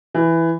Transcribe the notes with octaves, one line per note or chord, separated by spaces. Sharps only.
E3